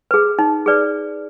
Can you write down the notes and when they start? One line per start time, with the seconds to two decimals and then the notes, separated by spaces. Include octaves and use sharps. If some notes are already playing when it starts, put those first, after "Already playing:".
0.11 G#4 B4
0.39 D#4
0.66 G#4 B4 D5